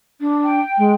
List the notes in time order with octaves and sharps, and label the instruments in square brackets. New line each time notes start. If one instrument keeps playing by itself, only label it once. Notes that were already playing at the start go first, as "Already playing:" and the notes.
[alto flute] D4
[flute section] G5
[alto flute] G#3